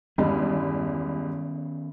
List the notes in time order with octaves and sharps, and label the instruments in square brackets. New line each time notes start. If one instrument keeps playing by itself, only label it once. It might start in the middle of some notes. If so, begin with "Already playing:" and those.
[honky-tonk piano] E2 G2 G#3 [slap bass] D#3 B3 C#4